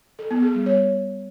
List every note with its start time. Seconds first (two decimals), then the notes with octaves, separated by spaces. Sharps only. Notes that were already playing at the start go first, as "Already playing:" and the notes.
0.19 A4
0.31 B3
0.42 G#4
0.54 G3
0.66 C#5